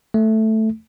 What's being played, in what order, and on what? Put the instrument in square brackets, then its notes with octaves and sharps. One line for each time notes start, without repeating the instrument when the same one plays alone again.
[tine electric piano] A3